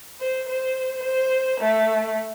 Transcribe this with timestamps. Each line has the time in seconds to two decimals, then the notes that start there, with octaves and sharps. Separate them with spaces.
0.20 C5
0.49 C5
1.04 C5
1.61 A3